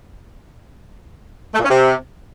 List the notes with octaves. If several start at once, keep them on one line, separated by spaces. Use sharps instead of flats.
A3
A#2
C#4
C3